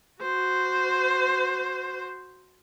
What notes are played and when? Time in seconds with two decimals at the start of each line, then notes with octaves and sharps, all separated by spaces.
0.22 F#4 C5